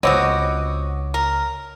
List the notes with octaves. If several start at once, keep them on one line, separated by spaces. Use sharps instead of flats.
C#2 B3 C4 F#4 C#5 D#5 D6
A#4